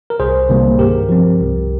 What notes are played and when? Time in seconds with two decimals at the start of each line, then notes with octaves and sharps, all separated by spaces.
0.10 A#4
0.20 C2 G#4 C5
0.49 C3 D#3 G3 A#3
0.79 G2 G4 A#4
1.09 F3 C4
1.40 C2